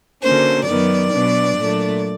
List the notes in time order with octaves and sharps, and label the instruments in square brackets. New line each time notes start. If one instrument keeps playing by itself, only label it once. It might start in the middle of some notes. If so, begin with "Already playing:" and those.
[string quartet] D3 F#3 A#3 C#4 C5
F#2 D#3 F#3 B3 D5
B2 F#3 B3 D4
A#2 F#3 A3 D4